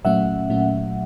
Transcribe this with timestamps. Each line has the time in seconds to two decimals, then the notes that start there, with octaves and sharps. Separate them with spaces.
0.05 A#2 F#3 A3 C#4 E5 F#5
0.50 A#2 F#3 A3 C#4